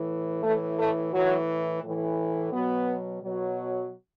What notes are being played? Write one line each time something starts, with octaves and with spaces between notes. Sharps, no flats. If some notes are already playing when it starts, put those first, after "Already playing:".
Already playing: A2 E3
A2 E3 A3
A3
A2 E3 F#3
A2 E3
B2 F#3 B3
B2 F#3